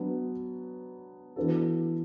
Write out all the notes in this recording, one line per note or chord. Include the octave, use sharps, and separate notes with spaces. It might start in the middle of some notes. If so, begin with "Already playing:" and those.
Already playing: F#3 B3 D4
E3 B3 D4 F#4 A4